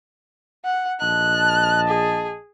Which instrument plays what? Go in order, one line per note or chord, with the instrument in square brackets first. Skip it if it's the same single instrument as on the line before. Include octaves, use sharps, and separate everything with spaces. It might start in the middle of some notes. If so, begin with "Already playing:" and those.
[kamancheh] F#5
[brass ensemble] A#1 D#5 A5 [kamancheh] F#6
[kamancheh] G#4